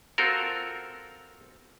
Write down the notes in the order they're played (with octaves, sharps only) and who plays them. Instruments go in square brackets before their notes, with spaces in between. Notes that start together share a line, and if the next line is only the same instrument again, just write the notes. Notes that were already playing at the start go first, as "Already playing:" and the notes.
[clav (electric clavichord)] C4 F4 F#4 A4 A#4